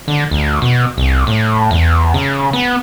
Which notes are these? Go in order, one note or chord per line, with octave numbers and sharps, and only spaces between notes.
D3
D2
B2
C2
A2
E2
C#3
B3